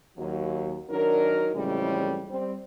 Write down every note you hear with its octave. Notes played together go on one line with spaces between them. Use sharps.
D#2 F#3
D#3 F#3 D4 D#4 A#4
F2 A2 C#3 E3 G3 G#3
G3 C4